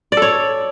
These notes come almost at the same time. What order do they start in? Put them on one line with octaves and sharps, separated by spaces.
D5 A4 C#5